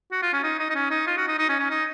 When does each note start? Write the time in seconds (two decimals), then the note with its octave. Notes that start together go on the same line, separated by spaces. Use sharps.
0.12 F#4
0.22 F4
0.33 C#4
0.43 D#4
0.59 D#4
0.70 D#4
0.75 C#4
0.91 D#4
1.07 F4
1.17 F#4
1.28 D#4
1.38 D#4
1.49 C#4
1.59 C#4
1.70 D#4